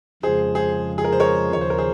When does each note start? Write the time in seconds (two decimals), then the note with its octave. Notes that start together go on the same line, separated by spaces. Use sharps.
0.23 F2 C#3 F3 G#3 G#4 C5
0.55 G#4 C5
0.98 G#4
1.04 A#4
1.12 C5
1.20 A#4 C#5
1.53 D#2 C#3 F3 C#5
1.61 C5
1.70 A#4
1.78 G#4 C5